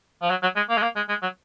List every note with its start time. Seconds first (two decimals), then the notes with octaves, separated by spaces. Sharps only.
0.22 F3
0.30 F#3
0.43 F#3
0.56 G#3
0.69 A#3
0.77 G#3
0.82 A#3
0.96 G#3
1.09 G#3
1.22 F#3